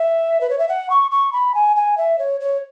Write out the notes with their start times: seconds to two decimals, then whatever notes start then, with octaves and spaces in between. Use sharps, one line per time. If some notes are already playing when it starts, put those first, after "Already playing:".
Already playing: E5
0.40 B4
0.49 C#5
0.58 E5
0.68 F#5
0.90 C#6
1.11 C#6
1.32 B5
1.54 G#5
1.76 G#5
1.97 E5
2.18 C#5
2.40 C#5